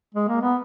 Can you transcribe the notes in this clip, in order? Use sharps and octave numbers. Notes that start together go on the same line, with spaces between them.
G#3
A#3
B3